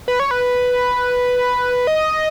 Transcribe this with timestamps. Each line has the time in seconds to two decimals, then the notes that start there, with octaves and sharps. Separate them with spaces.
0.08 B4
0.20 C#5
0.31 B4
1.87 D#5